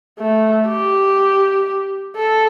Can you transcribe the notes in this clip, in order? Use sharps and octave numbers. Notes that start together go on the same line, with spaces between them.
A3
G4
A4